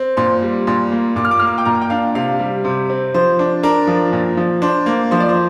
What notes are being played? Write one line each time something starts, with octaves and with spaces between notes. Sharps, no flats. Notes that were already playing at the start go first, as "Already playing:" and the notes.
Already playing: C4
A#2 C6
G3
A#2 C6
A#3
A#2 D6
F6
D6
A#3 F6
D6
G5
A#2 A#5
G5
D4 F5
C3 F5
G3
C3 C5
C4
F3 C5
D4
D4 A#4
F3
A#2
F3
D4 C5
A#3
F3 C5
D5
C5